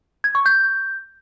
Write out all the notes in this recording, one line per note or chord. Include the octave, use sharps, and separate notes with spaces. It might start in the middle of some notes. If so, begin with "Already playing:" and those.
G#6
C#6
G6